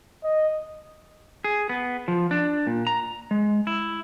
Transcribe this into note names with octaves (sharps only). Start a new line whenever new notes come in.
D#5
G#4
B3
F3
D4
A#2
A#5
G#3
E4